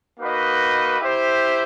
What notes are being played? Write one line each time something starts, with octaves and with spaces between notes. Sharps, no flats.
A#3 D#4 F#4 B4 D#5
E4 G4 C5